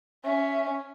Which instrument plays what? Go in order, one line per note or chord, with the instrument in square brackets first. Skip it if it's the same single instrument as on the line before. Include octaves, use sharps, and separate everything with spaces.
[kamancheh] C#4 [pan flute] E5